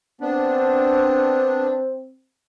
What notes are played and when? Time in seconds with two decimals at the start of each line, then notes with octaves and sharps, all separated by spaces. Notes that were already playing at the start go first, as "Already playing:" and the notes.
0.21 B3 C4 D4